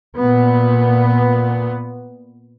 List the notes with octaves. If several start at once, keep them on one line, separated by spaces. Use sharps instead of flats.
A#2 B3